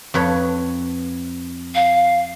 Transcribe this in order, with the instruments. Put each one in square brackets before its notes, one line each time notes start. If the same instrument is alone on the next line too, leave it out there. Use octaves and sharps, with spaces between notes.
[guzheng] F2 B4 C#5
[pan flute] F5